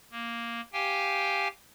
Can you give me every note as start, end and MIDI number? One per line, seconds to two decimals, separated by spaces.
0.11 0.61 58
0.73 1.48 67
0.73 1.48 77
0.73 1.48 79
0.73 1.48 80